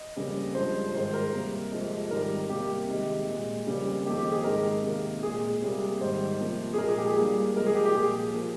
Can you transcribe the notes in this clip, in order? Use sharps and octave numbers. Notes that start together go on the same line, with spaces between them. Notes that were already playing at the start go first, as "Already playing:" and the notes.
Already playing: D#5
F2 C#3 G3 A#3
G2 F3 G#3 C5
G#2 D#3 G#3 C5
A#4
C3 G3 A#3
F2 C3 F3 G#3
G#2 D#3 G3 A#4
C3 G3 A#3 G4
C3 D#3 G#3
A#2 G#3
F2 C#3 G3 A#3
F2 D#3 A#3 G4
G4
G#4
G#2 D#3 G#3 A#4
C3 D#3 A#3
A#2 G#3 G#4
C3 G3 A#3
G#2 D#3 G3 C5
C3 F3 A#3
G#4
A#2 F3 G#3 A#4
G#4
G4
G#4
G2 G3 A#3
C3 F3 G#3 A#4
G#4
G4
G4
A#2 F3 A#3 G#4
F3 A#3